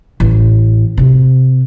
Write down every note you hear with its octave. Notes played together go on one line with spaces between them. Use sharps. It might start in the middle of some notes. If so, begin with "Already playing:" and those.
A1
C3